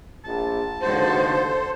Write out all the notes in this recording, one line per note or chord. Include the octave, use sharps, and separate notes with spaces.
A#1 A5
A1 D#2 D3 G#3 F#4 C5
A4